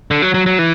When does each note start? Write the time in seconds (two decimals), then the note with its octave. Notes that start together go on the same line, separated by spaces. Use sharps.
0.11 D3
0.22 F#3
0.34 F#3
0.46 F#3
0.59 E3